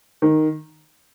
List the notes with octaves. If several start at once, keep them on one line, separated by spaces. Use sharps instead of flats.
D#3